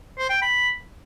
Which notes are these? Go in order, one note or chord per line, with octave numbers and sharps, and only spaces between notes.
C5
G5
B5